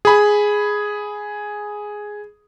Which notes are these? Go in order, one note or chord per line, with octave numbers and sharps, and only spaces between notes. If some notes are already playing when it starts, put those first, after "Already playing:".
G#4 B5